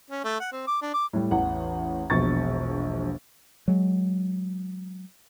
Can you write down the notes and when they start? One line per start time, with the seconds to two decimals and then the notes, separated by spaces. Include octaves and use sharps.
0.10 C#4
0.24 A3
0.40 F#5
0.52 C4
0.67 D6
0.82 D4
0.94 D6
1.13 A2 G3
1.31 A1 E2 F#5
2.10 E1 A#1 B2 C#6 A6
3.68 F#3 G#3